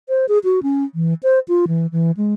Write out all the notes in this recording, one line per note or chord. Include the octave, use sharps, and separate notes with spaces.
C5
G#4
F#4
C#4
E3
C5
F4
E3
E3
G#3